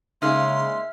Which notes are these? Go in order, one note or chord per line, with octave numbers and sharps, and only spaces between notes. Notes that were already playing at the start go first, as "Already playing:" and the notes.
C#3 G#3 A#3 D#4 E5 C6 F6